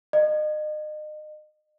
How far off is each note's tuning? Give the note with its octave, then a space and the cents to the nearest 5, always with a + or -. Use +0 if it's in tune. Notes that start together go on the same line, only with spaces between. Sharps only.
D#5 -35